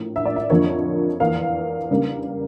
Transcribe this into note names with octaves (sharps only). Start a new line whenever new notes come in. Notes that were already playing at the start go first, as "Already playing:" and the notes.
Already playing: A2 F3 A#3
E5
D5
E5
F2 D3 F3 A#3 C#5
E2 E3 A#3 F5
C#3 G3 A#3